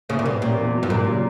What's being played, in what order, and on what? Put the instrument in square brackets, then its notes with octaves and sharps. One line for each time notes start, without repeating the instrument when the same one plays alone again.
[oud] C#3 [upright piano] A#3 E4
[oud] A#2
[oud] B2 [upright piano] G3
[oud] A#2 [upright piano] A#3 C#4 G4
[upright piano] E2
B2 F#3
[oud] G2
[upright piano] C#2 [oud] A#2
[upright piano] C#3 F#3